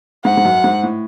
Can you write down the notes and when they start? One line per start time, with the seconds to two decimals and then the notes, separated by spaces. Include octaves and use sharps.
0.25 G#2 F#5
0.37 G#2
0.45 F#2
0.64 G#2
0.83 A2